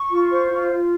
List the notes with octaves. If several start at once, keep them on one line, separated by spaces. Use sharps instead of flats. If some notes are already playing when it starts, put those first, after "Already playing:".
Already playing: C#6
F4
C5
F4
F4